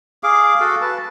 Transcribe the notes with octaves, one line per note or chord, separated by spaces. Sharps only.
G#4 F5 D6
F#4 A4 F5
B4 A5